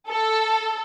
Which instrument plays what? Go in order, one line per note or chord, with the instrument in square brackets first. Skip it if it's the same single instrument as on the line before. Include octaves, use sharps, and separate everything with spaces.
[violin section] A4